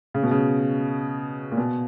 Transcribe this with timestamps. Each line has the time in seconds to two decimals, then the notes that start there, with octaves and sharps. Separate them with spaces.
0.14 C#3
0.23 B2
0.31 C#3
1.52 A#2
1.57 B2